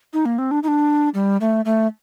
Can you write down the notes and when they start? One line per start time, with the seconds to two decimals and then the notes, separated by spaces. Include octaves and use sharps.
0.13 D#4
0.25 A#3
0.38 C4
0.51 D4
0.63 D#4
0.68 D4
1.14 G3
1.41 A3
1.65 A3